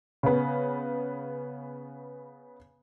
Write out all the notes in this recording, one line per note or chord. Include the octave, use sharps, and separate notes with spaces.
C#3 B3